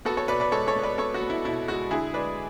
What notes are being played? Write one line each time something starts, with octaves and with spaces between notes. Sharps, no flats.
B3 F#4 A4
A4 C#5
B2 B4 D5
B4 D5
G#3 A4 C#5
A4 C#5
B3
B4 D5
B3 A4 C#5
F#4
B3
E4
B2 E4
G#3 F#4
D3 E4 G#4
G#3 B4 D5